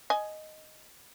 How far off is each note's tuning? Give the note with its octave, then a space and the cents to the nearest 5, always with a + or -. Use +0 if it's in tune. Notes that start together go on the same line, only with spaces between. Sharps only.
D#5 +0 G#5 +15